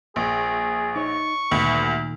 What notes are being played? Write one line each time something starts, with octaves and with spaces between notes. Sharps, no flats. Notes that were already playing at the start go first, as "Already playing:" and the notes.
A#1 G#4
D#4 C#5 C#6
D2 A#2 D#3 B3